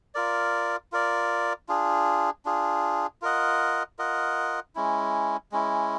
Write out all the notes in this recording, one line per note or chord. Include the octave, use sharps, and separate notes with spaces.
F4 A#4 D5
F4 A#4 D5
D4 F4 G#4
D4 F4 G#4
F4 A#4 D#5 F#5
F4 A#4 D#5 F#5
G#3 C#4 E4
G#3 C#4 E4